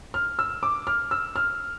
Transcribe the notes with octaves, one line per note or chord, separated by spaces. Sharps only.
F6
E6
D6
F6
E6
F6